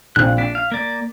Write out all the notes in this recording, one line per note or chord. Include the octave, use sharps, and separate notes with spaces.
A#1 C4 F5 F#6
D4 B6
F5
A#3 D5